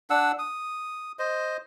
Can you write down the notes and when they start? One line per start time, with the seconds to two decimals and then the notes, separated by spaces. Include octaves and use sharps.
0.10 D4 F#5 E6
0.39 D#6
1.19 C5 D#5